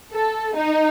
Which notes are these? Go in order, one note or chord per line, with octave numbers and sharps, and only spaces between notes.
A4
D#4